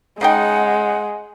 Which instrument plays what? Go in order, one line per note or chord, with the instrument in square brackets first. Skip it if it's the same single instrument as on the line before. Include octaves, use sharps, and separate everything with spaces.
[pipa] C#3 D#4 G5 [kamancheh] G#3 [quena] F#5